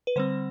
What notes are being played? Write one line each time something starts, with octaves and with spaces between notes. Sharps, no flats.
B4
D3 G3 C4 C5